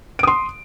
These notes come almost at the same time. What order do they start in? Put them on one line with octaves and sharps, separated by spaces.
D7 D#6 C6